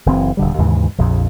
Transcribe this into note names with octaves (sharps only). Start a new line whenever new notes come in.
F#1 E3 C4
D#1 D3 G3
D#2 G#2 C#3 E3
A#1 F2